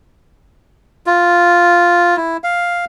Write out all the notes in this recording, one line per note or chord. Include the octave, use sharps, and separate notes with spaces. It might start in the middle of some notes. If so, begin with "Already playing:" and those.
F4
E4
F5